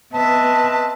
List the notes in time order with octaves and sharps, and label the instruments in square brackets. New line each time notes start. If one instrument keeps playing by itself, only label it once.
[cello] B3 E5 [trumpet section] C4 B4 D#5 [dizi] A5